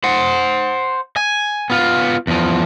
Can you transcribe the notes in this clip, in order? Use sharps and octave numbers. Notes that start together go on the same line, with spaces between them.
C5 F#5
G#5
B3 F4
E2 F3